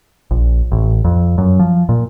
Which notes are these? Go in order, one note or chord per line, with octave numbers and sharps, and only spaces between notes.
A#1
A1
F2
F#2
F3
A#2